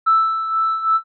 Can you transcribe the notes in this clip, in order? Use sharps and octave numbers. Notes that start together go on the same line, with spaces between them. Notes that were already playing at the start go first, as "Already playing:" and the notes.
E6